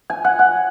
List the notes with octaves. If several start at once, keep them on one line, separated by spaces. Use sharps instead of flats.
G#5
F#5
F#5